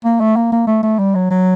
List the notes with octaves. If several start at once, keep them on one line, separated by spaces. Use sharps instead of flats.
A#3
A3
A#3
A#3
A3
A3
G3
F#3
F#3